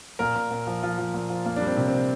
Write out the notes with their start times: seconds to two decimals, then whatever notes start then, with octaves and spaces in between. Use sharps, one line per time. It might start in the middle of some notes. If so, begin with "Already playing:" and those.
0.19 A#2 A#4
0.36 A#2
0.51 A#2
0.67 F3
0.83 F3 F4
0.98 F3
1.14 A#2
1.30 F3
1.45 A#3
1.56 G3 D4
1.67 C4
1.77 C3
1.88 C4
1.93 C3